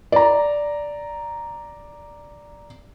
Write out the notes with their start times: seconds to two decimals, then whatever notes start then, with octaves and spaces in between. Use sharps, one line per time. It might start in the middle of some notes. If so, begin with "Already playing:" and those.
0.12 D5 A#5